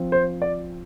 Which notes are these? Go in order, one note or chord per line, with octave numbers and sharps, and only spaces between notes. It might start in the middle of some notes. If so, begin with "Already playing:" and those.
Already playing: F3 C4
C5
D5